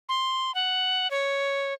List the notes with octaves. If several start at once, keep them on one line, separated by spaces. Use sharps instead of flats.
C6
F#5
C#5